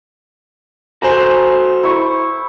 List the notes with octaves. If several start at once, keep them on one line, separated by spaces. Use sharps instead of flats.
F#4 A4 B4 C5 G#5 A#5
E4 C#6